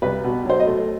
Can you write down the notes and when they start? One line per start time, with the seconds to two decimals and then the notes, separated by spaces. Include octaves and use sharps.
0.02 C2 B4
0.24 B2
0.45 F#3 C5
0.60 D#5
0.66 A3